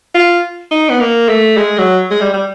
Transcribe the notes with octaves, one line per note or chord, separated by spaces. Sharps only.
F4
D#4
B3
A#3
A3
G#3
F#3
G#3
G3
G3